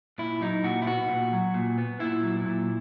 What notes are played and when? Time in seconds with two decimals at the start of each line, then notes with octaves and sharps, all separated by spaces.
0.18 A#2 E4
0.41 F#3 D#4
0.64 A#2 F#4
0.82 E4
0.87 B3 F#4
1.09 A#2
1.32 F#3
1.54 A#2
1.78 B3
2.00 A#2 E4
2.23 F#3
2.45 A#2